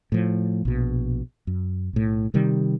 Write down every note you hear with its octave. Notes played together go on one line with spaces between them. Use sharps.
A2 F3
A#1 B2
F#2
B1 A2
C3 D#3 G3